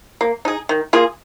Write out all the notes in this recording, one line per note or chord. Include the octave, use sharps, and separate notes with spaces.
A#3
D#4 G#4
D#3
A#3 F4 G#4